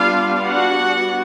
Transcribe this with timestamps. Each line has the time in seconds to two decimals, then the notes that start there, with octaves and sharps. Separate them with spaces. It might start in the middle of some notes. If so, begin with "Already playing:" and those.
Already playing: G3 B3 D4 F4 F5
0.46 F#4 F#5